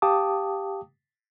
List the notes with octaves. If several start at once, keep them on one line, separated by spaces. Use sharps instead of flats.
G4 F5 G5 A5 D6 D#6